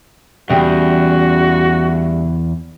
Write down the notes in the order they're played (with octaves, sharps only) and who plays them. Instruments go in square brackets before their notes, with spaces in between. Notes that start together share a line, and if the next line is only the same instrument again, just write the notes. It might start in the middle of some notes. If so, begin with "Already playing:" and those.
[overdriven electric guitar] E2 [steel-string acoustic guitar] C#3 G3 G5 [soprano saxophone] F#4